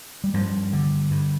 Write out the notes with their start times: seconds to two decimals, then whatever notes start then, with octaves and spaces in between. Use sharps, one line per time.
0.24 G3
0.34 G2 F3
0.73 D3
1.11 G2